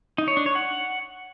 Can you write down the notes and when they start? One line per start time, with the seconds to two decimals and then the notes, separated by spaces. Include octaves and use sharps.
0.18 D#4
0.28 C#5
0.37 D4
0.46 C#5
0.55 F#5